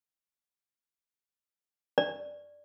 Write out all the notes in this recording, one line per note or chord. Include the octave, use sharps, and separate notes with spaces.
D5